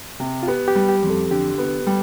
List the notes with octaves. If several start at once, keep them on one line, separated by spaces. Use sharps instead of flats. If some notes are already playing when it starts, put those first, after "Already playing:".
C3
F4
B3 G4
G4
G3
G4
F2
A4
D3 G4
B3
G3